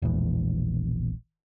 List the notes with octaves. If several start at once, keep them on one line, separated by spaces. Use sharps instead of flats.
E1 A#1 E2